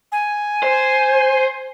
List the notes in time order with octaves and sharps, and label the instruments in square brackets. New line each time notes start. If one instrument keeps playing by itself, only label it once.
[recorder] G#5
[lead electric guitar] C5